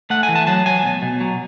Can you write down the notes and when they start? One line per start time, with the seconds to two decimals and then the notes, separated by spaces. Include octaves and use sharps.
0.10 A3 F#5
0.23 G#5
0.29 E3
0.36 A5
0.47 F#3 A5
0.66 F#3 G#5
0.85 B2
1.02 B2
1.20 F#3